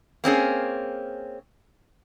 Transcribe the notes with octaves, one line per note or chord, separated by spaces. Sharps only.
A#3 C4 C#4 G#4